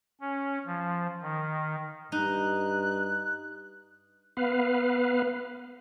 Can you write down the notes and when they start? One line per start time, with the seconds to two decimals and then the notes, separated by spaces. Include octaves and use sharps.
0.21 C#4
0.66 F3
1.22 D#3
2.12 G2 D#4 F#6
4.37 B3 B4 F5